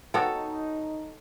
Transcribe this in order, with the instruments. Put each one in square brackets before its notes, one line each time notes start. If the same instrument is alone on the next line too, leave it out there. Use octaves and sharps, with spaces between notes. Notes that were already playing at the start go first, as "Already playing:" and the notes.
[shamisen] B3 F#4 G5 [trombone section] D#4 [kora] A4 C#5